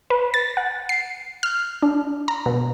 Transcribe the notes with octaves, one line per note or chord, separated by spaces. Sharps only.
B4
A6
F#5
C7
F6
D4
A#5
B2